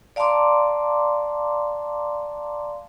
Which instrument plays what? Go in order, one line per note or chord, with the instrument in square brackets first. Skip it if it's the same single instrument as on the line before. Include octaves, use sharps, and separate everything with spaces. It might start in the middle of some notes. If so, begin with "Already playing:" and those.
[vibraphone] D5 F5 A5 A#5 C6 D6